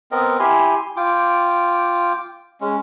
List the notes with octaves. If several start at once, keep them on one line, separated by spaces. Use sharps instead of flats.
B3 C4 A#4 D#5
E4 G4 G#5 C6
F4 G5 D6
G#3 C#4